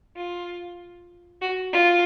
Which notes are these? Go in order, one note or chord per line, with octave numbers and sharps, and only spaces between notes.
F4
F#4
F4